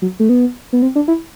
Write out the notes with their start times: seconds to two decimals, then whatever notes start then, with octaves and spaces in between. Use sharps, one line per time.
0.02 F#3
0.20 A3
0.29 B3
0.73 B3
0.82 C4
0.95 D4
1.08 E4